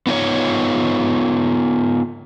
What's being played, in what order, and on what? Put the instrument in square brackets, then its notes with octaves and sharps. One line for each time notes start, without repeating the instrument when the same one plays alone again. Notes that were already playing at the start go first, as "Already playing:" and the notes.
[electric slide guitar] B3 D#4 F4 C#5